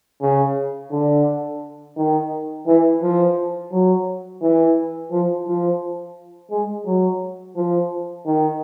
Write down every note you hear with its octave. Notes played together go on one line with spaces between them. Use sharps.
C#3
D3
D#3
E3
F3
F#3
E3
F3
F3
G#3
F#3
F3
D#3